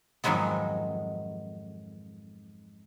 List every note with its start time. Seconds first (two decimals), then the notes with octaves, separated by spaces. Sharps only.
0.24 F2 G#2 D#3 F#3 G#3 B3